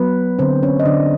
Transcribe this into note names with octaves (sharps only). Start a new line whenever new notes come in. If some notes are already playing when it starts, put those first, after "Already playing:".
Already playing: F#3 B3 B4
D3 C4 C5
C#4 C#5
D#5
D3 D4 D5